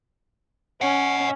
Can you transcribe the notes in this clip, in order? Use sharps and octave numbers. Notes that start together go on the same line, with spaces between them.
C#4 D#5 F#5